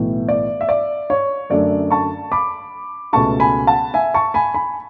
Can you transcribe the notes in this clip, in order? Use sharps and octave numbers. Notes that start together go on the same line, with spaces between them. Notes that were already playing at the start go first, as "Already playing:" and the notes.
Already playing: B1 A2 E3
D5
E5
D5
C#5
F#2 D3 A3 D4 D5
A5 C#6
B5 D6
C#2 B2 A3 C#4 A5 C#6
G#5 B5
F#5 A5
E5 G#5
A5 C#6
G#5 B5
G#5 B5